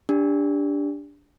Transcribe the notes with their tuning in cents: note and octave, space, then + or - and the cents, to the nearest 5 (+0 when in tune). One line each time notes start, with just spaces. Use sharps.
D4 -15 G4 +25